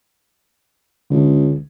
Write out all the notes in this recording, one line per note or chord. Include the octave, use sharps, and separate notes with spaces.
C#2 D3